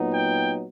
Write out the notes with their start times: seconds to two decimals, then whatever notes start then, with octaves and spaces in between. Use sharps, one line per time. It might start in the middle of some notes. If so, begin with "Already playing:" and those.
Already playing: A#2 F#3 B3 D#4
0.14 G5